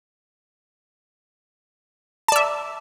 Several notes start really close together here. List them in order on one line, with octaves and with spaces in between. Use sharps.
A5 D5 E5